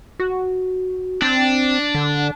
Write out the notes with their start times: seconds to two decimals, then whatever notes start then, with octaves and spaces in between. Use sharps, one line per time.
0.20 F#4
1.22 C4 D4
1.95 D3